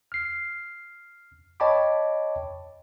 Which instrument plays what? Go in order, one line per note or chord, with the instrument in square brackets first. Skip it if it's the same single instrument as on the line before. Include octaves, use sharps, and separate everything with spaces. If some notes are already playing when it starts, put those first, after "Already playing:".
[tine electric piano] F6 C7
C#5 D#5 G5 A5 B5 D6